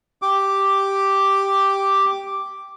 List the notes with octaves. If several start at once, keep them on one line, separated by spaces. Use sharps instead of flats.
G4 D6